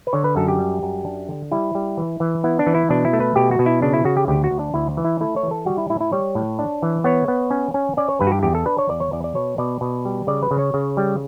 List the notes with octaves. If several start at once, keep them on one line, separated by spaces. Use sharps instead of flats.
B4
D3 C#5
B4
F#2 A4
G4
G3
F#2
D4
D3
G3 E4
G3
E3
E3
B3 E4
D4
E3
E4
B2 D4
E4
A3
B4
B2 G4
F#4
B2
E4
C#3 D4
E4
C#3 F#4
G4
D2 G4
F#4
D2
D4
D2 E4
E3
E4
A3 E4
C#5
E3
A4
G3 F#4
E4
A2 E4
E4
G3 C#5
A2
D4
E3
B3 C#5
B3
C#4
C#4
C#4 D5
C#5
G2 B4
F#4
G4
E2 G4
A4
D4 B4
C#5
E2 D5
C#5
E2 D5
D5
B2 C#5
B2 D5
B2
G3
C#3 D5
B4
C#3
C#5
C#3
G3